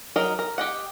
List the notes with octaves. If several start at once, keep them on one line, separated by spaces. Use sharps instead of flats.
F#3 D#4 A#4 D#5
A#4
G4 D#5 F#5